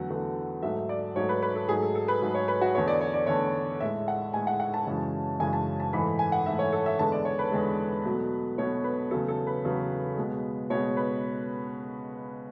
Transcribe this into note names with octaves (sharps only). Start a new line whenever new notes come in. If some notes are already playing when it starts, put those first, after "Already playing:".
Already playing: E2 D3 F#3 A3 F#5
E2 D3 F#3 A3
G#2 F#3 A3 E5
D5
G#2 F#3 A3 C#5
B4
B4
A4
G#2 F#3 A3 G#4
A4
A4
B4
G#2 F#3 A3
C#5
B4
F#4
E2 D3 A3 C#5
D5
C#5
D5
E2 D3 A3 C#5
A2 G#3 E5
F#5
A2 G#3 G#5
F#5
F#5
A5
F#2 C#3 E3 G#3
F#2 C#3 E3 G#3 G#5
A5
A5
G#2 E3 A3 B5
G#5
F#5
G#2 E3 A3 E5
C#5
A4
E5
E2 D3 G#3 A5
D5
C#5
B4
E2 D3 G#3
B2 F#3 A3
B2 F#3 A3 C#5
B4
E2 C#3 F#3 A3 A4
A4
B4
E2 C#3 F#3 A3
B2 G#3
B2 G#3 C#5
B4